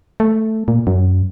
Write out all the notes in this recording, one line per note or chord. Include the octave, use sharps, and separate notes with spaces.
A3
A#2
F#2